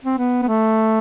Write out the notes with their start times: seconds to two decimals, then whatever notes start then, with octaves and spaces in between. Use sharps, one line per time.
0.05 C4
0.18 B3
0.43 B3
0.48 A3